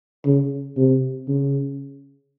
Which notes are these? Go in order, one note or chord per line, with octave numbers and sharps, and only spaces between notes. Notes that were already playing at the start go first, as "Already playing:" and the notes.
C#3
C3
C#3